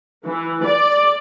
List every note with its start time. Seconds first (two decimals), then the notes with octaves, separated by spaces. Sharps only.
0.25 E3
0.66 D5